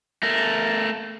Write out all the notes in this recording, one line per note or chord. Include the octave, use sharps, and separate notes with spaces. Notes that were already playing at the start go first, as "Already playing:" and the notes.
A3 A#4